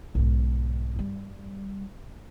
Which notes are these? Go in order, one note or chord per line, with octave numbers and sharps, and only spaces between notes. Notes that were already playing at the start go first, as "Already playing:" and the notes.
B1 G#2
G2 G3